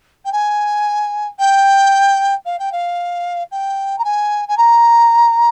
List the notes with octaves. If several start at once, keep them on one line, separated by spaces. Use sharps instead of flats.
G5
G#5
G5
F5
G5
F5
G5
A#5
G#5
G#5
A#5